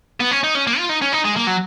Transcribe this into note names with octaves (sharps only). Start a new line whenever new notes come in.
B3
C#4
D#4
C#4
A#3
F4
D#4
C#4
D#4
G#3
A#3
F#3